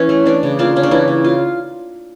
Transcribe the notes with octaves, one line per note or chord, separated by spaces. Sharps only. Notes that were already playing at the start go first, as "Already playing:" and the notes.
Already playing: E3 C#4 E4
A3
E3 D4
C#3
A#3 D4 F4
C#3 C#4
D4
E3 C#4 E4
C#3
F4